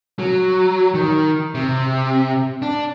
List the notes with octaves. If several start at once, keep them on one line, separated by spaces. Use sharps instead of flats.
F#3
D#3
C3
D4